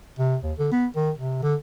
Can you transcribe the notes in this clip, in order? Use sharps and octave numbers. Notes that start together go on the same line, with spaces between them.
C3
D#2
D3
B3
D#3
C3
D3